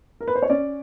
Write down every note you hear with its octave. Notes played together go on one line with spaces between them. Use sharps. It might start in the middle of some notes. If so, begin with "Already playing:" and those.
A#4
B4
C5
C#5
C#4 D5